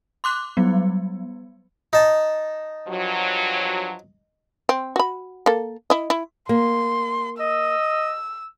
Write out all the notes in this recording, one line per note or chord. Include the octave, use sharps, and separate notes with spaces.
C6 D6 F#6
F#3 G3 B3
D#4 A5
G2 F3 F#3
C4
F#4 B5
A#3 A4
E4 D#5
E4
A#3 C6
D#5 E6